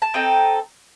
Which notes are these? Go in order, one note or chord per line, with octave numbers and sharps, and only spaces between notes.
A5
C4 D#4 A4 G5